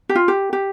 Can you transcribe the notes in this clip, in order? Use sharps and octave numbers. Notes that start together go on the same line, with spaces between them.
G4
F4
G4
G4